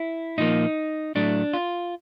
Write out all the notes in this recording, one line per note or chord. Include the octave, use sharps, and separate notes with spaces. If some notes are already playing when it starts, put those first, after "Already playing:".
Already playing: E4
A#2 F3 A#3 D#4
A2 F#3 A3 D4
F4